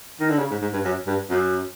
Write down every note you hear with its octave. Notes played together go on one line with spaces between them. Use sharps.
D#3
D3
C#3
G#2
G#2
G2
F#2
G2
F#2